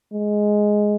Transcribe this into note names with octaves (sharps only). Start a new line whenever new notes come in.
G#3